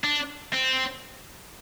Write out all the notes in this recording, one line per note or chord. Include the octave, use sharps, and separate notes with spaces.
D4
C4